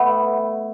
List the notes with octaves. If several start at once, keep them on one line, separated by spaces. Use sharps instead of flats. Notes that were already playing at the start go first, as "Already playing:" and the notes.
Already playing: A3 B3